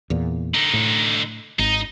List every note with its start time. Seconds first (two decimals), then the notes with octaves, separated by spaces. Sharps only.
0.10 E2 A#2
0.55 D3 D#4
0.74 A2
1.59 G#1 D#4